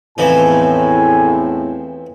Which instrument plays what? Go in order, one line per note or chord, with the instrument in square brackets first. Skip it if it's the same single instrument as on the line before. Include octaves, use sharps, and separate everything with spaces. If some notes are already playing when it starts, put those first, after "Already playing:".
[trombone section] E2 A2 [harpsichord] E3 F3 D#4 [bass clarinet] C4 [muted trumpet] G#5